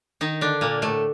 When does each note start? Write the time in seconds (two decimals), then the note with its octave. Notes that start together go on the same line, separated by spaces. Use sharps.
0.21 D#3 D#4
0.41 D3 D4
0.61 A#2 A#3
0.82 A2 A3